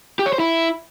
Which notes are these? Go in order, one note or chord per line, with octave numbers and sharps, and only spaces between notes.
G4
C#5
C5
E4